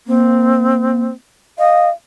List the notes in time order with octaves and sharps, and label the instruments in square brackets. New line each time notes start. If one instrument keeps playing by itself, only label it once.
[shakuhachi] A#3 [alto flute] C4
[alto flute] D#5 [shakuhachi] F5